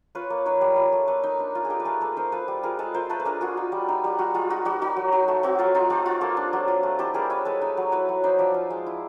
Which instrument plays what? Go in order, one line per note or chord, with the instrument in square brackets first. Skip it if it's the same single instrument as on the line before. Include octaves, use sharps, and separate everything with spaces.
[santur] F4 B4 C#5
A#3
D#4 B4 C#5
G3
F4
A3
A#3 A4 B4
D#4
D4
F4
G#4
D#4 G4 A4
B4
A3 G#4 A#4
A#3 A4 B4
D#4 A#4 C5
F4 A4 B4
G3
F4 G#4 A#4
G#3 A4 B4
F4 A#4 C5
A3 A4 B4
B4
D4 G#4 A#4
F4 F#4 G#4
D#4
G3
D#4
G3
F4 F#4
G#3 F4
D#4 F#4
G3 F#4
D#4 F#4
F#3
D#4
A3
C4 F#4
F#3 F4
D#4 F4
A3 F4 G4
F4 F#4
A#3 G4 A4
D4
F#3
F4
A3
E4 G4 A4
G3 G#4 A#4
E4 B4 C#5
G#3 A4 B4
D#4
F#3
E4 B4 C#5
F#3
D#4 C5 D5
F3 D5 E5
F4
G#3
E4